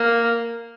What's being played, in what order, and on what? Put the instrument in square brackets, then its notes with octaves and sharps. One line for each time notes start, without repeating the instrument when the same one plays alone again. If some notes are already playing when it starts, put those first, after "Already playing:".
Already playing: [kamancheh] A#3